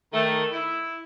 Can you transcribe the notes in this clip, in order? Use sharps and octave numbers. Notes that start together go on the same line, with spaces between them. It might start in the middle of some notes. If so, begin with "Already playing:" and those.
D#3 A3
E4